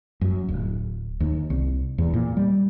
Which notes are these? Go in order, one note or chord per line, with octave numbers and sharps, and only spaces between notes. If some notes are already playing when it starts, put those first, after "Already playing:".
F#2
D1
D#2
C2
E2
A#2
G3